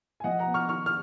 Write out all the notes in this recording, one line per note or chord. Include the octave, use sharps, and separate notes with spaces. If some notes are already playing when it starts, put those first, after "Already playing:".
G#5
F3 D#5 F#5
F#5 A#5
B3
C#6 F6
D#3 C#6 F6
F6